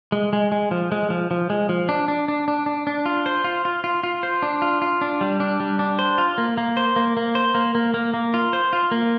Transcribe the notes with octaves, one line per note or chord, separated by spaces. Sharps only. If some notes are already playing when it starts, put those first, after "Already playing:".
G#3
G#3
G#3
F3
G#3
F3
F3
G#3
F3
D4
D4
D4
D4
D4
D4
F4
C5
F4
F4
F4
F4
C5
D4
F4
F4
D4
G3
D4
G3
D4
C5
F4
A#3
A#3
C5
A#3
A#3
C5
A#3
A#3
A#3
A#3
F4
C5
F4
A#3